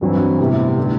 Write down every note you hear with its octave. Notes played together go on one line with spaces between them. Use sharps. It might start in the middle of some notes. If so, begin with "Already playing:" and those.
G2 E3 F#3 C4
A2 C3 G3 B3 E4 G4
D3 A3 E4